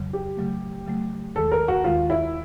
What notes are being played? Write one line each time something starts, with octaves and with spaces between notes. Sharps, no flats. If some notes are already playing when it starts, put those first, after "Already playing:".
Already playing: F2 C#3 F#3
G4
C#3 F#3 A3
C#3 F#3 A3
D#2 D#3 G#3 A4
A#4
F#4
D#2 D#3 G#3 F4
E4